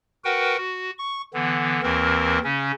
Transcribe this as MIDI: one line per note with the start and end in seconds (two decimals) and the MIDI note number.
0.24 0.57 66
0.24 0.57 70
0.24 0.57 71
0.24 0.57 78
0.24 0.57 79
0.57 0.91 66
0.98 1.22 85
1.34 1.81 50
1.34 1.81 52
1.34 1.81 59
1.83 2.39 39
1.83 2.39 52
1.83 2.39 60
1.83 2.39 70
2.44 2.72 49
2.44 2.72 61